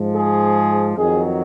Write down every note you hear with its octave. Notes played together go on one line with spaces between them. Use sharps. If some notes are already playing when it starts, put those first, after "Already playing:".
Already playing: G#2 F3
G#4
F2 D#3 F#3 G#4